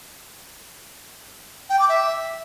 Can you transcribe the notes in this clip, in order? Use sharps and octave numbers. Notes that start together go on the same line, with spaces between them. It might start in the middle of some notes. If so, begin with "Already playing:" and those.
G5
D6
E5